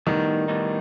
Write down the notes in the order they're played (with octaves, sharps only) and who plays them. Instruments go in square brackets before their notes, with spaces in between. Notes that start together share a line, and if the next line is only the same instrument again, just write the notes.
[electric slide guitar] A2 G3 B3 D#4 [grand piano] D#3
[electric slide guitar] A2 G3 B3 D#4